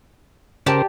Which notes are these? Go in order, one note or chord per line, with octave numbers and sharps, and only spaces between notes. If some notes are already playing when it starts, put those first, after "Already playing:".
C#3 G4 A#4 C5 D5 A5